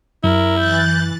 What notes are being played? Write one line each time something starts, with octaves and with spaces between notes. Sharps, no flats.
F#2 E4 A#4
E3 F#6 G6 A6